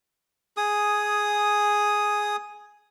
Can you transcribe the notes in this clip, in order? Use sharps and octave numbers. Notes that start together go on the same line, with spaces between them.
G#4 D#6